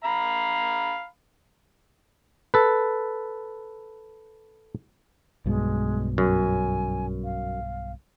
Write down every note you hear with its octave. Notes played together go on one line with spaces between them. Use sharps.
F5 A#5 B5
A4 B4
B1 G2 B2 G#3
F#2 G#5
F5